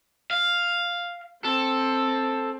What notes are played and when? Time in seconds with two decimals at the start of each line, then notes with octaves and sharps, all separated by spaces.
0.31 F5
1.44 C4 A4